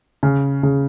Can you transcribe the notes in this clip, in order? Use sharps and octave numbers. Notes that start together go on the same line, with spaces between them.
C#3
C#3